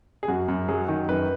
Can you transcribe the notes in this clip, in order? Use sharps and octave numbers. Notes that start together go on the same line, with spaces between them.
G#4
F#2 F#4
F#2
F#3 G#4
D#3
F#2 B4